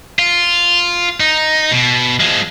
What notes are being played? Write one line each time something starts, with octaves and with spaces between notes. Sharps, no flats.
F4
D#4
B2
F3 G#3